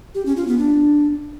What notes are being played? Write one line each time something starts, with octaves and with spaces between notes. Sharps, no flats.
G4
C#4
F4
B3
D4